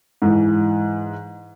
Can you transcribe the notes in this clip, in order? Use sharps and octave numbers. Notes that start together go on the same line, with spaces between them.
G#2 E3